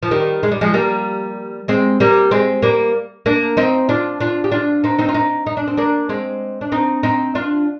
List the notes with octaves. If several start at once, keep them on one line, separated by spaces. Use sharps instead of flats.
F3
D#3 G3
G#3
G3
F3 G#3
G3 A#3
G#3 C4
G3 A#3
G#3 C4
G3 A#3
A#3 D4
C4 D#4
D4 F4
D4 F4
G4
D4 F4
C4 D#4
C4 D#4
F4
C4 D#4
D#4
D4
C4
A#3 D4
G#3 C4
D4
C4 D#4
C4 D#4
D4 F4